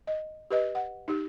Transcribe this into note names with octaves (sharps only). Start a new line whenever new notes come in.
D#5
G4 B4 D#5
F#5
D#4 G4